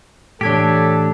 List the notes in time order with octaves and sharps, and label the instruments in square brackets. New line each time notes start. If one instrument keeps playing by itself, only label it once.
[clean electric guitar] A2 E3 [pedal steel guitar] D4 G4 [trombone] A4 [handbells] C#5 G#6 B6